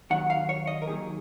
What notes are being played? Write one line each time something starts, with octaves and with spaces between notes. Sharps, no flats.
D#2 D#3 F#3 F#5
F5
C#5
D#5
A#4
D#2 D#3 F#3 G#4